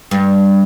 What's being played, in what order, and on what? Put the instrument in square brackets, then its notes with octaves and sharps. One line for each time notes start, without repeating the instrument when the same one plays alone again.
[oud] G2